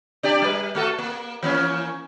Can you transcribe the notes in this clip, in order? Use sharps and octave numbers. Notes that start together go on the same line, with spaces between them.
D4 G4 D5
G3 B4
A3 F#4 A4
A#3
E3 A#3 C#4